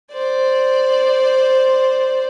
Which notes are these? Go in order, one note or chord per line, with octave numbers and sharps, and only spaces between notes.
C5 D5